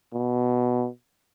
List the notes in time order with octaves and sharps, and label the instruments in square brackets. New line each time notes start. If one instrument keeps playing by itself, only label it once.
[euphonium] B2